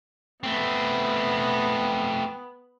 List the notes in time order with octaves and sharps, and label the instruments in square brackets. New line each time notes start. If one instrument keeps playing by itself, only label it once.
[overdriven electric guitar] A3 C4 [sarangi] B3